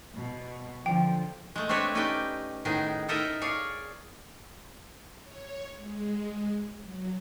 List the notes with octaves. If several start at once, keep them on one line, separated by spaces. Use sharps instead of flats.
B2
D3 F3 G5
G#3 A3
A3 C4 D4 B4 C#5 E5
C#4 D#4 G4 B4 D5 G5
A2 D#3 B3 D#4 G#4
D#4 E4 A4 A#4 D#5 E5
G#4 C#5 D5 F5
C#5
G#3
F#3